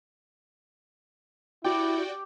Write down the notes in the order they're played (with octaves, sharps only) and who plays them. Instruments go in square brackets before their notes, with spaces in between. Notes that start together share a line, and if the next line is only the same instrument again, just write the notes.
[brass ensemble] E4 [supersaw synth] F#4 D5 G5 [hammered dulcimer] G4